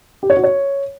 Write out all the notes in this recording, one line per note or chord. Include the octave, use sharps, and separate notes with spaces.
G4
C#5
F#4
C#5